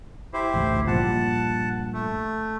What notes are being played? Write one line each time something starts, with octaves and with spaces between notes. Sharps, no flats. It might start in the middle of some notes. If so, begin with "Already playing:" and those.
E4 G4 C5
A1 D2 A2
G2 A#2 F3 F#5 A5
A3